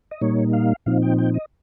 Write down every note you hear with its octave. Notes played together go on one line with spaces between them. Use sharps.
D#5
A#2 G3 A#3 D#4 C#5
F5
A#2 F3 C4 D#4 F5
G5
G5
D#5